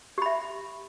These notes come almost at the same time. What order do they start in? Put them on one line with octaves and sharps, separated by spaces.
G4 B5 E5